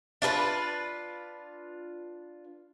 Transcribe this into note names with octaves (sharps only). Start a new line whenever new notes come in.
D4 F4 A4 B4